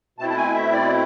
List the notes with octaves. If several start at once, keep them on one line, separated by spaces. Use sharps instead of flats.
B2 A3 C4 E4 A5
A5
G#5
E5
D5